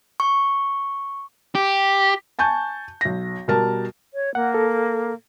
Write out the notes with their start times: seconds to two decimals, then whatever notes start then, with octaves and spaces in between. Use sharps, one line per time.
0.20 C#6
1.55 G4
2.39 G#5 A5 C#6 G6
3.01 B1 A#6
3.48 B2 G3 A#4 A5
4.14 C#5
4.35 A#3 F#5
4.54 A4